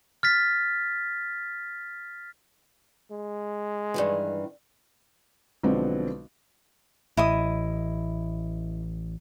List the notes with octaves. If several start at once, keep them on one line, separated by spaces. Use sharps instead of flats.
F6 A6 B6
G#3
G2 D#3 E3
B1 D3 F3 G#3 B3 C4
A1 E4 D#5 D#6